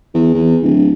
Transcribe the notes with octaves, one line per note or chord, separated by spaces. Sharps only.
E2
E2
D1